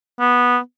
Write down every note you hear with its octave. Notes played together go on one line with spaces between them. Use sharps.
B3